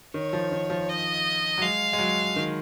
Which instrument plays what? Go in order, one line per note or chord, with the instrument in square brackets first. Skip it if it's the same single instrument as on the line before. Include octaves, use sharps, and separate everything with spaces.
[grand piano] D#3 [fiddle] C#5
[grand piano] F3
D#3
F3
[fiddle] D#5
[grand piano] F#3
[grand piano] G#3 [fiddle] F5
[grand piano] G#3
F#3
D#3